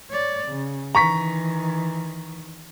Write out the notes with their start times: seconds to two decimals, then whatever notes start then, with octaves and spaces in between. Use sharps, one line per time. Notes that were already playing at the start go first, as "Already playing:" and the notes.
0.11 C#5 D5
0.48 C#3
0.95 D#3 E3 A#5 C#6 B6